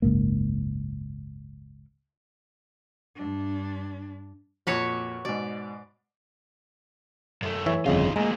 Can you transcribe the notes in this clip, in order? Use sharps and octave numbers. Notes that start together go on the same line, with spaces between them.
F#1 C#2 G#2 A#3
G2 D4
F2 A#2 F#4 B4 C#5
G#2 B2 D5
F#2 A3
E3 C#5 E5
G1 F2 C#3 D#4 F4
D2 A#2 G#3 A#5